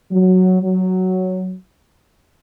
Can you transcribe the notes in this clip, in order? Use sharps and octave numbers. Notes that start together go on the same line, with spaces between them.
F#3
F#3